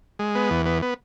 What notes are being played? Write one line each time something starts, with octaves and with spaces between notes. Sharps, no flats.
G#3
B3
E2
B3
B3